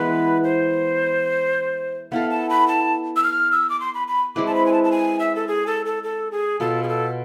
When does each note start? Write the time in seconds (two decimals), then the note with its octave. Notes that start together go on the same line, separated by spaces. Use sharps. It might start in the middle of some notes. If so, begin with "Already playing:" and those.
Already playing: E3 G#3 B3 B4
0.44 C5
2.12 B3 E4 A4 F5
2.30 A5
2.50 B5
2.68 A5
3.16 E6
3.23 F6
3.52 E6
3.69 D6
3.80 C6
3.94 B5
4.08 B5
4.36 G#3 C4 E4 B4 D6
4.46 A5
4.55 B5
4.66 G#5
4.73 A5
4.84 A5
4.91 G#5
5.19 E5
5.36 A4
5.48 G#4
5.67 A4
5.86 A4
6.03 A4
6.32 G#4
6.60 B2 B3 F4 A4
6.83 G#4
6.88 A4